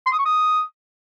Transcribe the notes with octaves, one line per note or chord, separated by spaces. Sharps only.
C6
D#6
C#6
D#6